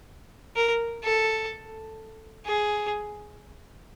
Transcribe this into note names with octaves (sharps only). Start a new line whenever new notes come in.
A#4
A4
G#4